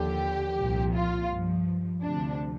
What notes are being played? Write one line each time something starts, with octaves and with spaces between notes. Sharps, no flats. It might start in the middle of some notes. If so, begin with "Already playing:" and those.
Already playing: D#2 D3 F3 G4
C2 A#2 F3
F4
G2 F3
D2 C3 F3 D4